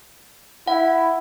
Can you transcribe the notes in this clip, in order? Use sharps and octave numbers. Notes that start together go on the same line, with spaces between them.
E4 F#5